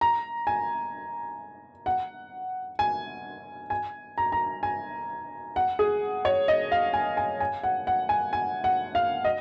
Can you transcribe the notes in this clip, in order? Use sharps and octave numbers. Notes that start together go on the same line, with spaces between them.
A#5
G#5
F#5
G#5
G#5
A#5
A#5
G#5
F#5
G#4
C#5
D#5
F5
G#5
G#5
G#5
F#5
F#5
G#5
G#5
F#5
F5
D#5